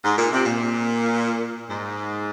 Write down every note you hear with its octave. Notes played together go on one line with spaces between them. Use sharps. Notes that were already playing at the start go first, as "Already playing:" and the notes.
G#2
A#2
C3
A#2
G#2